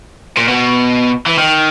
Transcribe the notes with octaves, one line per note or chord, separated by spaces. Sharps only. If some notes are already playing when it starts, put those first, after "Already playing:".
A#2
B2
E3
D#3